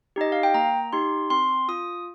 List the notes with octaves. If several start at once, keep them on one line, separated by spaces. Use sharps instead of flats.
D#4 G4 D#5
F5
G5
A#3 A#5
D#4 G4 C6
C4 C6
F4 D#6